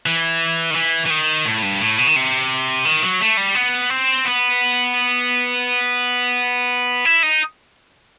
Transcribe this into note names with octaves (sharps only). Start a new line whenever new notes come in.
E3
D#3
E3
E3
D#3
A2
G2
A2
B2
D#3
C3
D#3
F#3
A3
G3
B3
C4
B3
E4
D#4